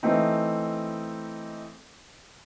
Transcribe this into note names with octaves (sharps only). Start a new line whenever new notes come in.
E3 A3 C4 D#4